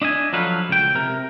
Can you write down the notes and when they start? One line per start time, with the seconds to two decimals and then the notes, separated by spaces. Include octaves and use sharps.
0.02 D4 D#5 E5 G#5
0.33 F3 F#3 A4 B4 F5
0.69 C#2 G5
0.95 C3 A#4